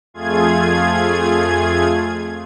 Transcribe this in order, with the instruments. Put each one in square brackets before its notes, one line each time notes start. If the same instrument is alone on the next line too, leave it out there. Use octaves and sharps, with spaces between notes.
[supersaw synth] F2 A3 F4 G#4 G#6